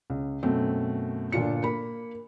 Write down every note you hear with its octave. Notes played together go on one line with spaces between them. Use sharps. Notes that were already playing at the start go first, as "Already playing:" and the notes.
C#2
F#2 B2 A3 C4
G1 A#2 D4 F4 C#7
A#3 B5